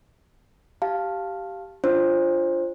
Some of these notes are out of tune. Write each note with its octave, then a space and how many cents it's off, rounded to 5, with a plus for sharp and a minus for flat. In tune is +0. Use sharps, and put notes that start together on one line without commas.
G4 -10 F5 +0 A5 +0
D4 +0 F4 -10 C5 +20